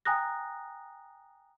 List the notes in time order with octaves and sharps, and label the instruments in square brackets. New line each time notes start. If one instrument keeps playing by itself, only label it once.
[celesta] G5 G#5 A#5 D#6 F#6 A#6